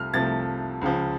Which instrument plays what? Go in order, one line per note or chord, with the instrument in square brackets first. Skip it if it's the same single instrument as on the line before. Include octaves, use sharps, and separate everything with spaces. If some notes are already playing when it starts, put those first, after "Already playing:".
Already playing: [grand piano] C2 C3 F3 A3 F6
C2 C3 F3 A3 A6
C#2 C#3 F3